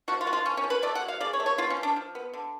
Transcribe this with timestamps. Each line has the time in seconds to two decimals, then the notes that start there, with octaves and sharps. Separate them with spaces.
0.08 F3 F#4
0.21 F4
0.26 F3 F#4
0.33 F4
0.45 F3 C#4
0.57 C#4
0.64 F3
0.70 B4
0.82 A3 D5
0.95 F#5
1.02 F#3
1.08 F5
1.20 C#3 D5
1.33 C#5
1.40 A3
1.46 C#5
1.58 B3 F4
1.70 C#4
1.77 F3
1.83 D4
1.96 F3
2.15 B3
2.34 D3